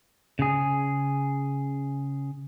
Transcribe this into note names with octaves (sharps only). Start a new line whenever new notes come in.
C#3 G#4